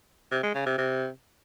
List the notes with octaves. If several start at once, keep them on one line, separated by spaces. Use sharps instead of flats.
C3
G#3
C#3
C3
C3